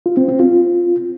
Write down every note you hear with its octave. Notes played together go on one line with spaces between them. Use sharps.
F4
C4
C4
F4